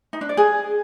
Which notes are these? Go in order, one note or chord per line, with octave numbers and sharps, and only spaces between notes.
D#4
D4
D5
G#4